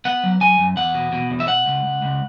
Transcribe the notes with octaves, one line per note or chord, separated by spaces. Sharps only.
B3 F#5
F#3
F#3 G#5
F#2
E2 F#5
B2
B2
E2
E5
B2 F#5
C#2
C#2
C#2